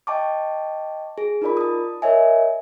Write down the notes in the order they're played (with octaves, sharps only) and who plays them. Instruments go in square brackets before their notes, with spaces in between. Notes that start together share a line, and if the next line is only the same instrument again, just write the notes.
[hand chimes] D#5 G5 A5 C#6 D6
G#4
D#4 F4 A#4 D5 B5
A5 D#6
A#4 C#5 D#5 E5 G#5